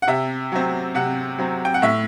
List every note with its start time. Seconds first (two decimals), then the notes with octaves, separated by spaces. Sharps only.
0.02 F#5
0.08 C3 E5
0.52 F#3 C4
0.95 C3 F#5
1.38 F#3 C4
1.65 G5
1.74 F#5
1.82 A2 E5